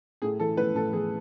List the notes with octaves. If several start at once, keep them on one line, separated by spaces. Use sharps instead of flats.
A2 G#4
E3 A4
A2 B4
A2 A4
E3 G#4